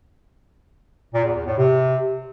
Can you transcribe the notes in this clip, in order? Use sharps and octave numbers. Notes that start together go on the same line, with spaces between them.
A#2
E2
E2
A2
C3